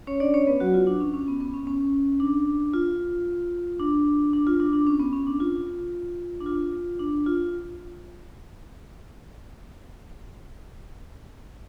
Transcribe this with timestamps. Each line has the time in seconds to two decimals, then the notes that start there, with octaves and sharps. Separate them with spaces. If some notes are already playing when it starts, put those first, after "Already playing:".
0.07 C#4 C#5
0.20 D4 D5
0.34 C#4 C#5
0.47 B3 B4
0.60 F#3 F#4
0.74 F4
0.87 D4
1.00 C#4
1.14 C#4
1.28 B3
1.40 B3
1.54 C#4
1.67 C#4
2.20 D4
2.74 F4
3.79 D4
4.33 D4
4.47 F4
4.60 D4
4.73 D4
4.87 C#4
5.00 B3
5.13 C#4
5.27 D4
5.40 F4
6.41 D4
6.46 F4
6.99 D4
7.26 F4